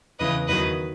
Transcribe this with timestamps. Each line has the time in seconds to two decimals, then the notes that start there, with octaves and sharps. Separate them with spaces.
0.19 E2 C#3 E3 B4 D#5
0.48 E2 D#3 F#3 B4 D#5